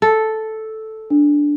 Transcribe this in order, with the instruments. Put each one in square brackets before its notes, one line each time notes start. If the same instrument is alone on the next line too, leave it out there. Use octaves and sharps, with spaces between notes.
[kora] A4
[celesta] D4